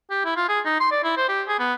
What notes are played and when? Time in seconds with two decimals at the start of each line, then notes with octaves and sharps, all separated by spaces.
0.10 G4
0.25 E4
0.36 F4
0.48 G#4
0.65 D#4
0.80 C6
0.91 D5
1.04 E4
1.17 C5
1.29 G4
1.48 G#4
1.59 B3